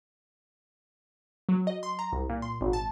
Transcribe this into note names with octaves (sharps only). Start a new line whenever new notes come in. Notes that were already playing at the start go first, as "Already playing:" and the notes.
F#3
D#5
C6
A#5
C2
A#2
C6
G#1
A5